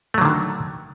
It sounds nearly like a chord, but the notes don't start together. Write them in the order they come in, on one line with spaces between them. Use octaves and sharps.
A3 F#3 D3 D#3